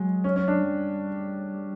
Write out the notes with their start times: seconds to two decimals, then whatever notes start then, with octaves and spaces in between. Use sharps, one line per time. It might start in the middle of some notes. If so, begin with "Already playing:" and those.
Already playing: F#3 G#3
0.24 C#4
0.36 C#4
0.48 D4
0.61 G3